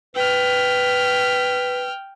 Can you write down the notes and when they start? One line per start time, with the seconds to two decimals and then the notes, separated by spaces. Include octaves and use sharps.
0.16 B4 G5 F6